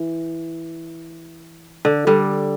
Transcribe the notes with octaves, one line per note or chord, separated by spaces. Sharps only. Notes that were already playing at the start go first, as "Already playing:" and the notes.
Already playing: E3
D3
D3 G3